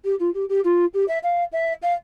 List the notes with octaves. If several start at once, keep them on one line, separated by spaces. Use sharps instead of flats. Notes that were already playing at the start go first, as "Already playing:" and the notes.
G4
F4
G4
G4
F4
G4
E5
F5
E5
F5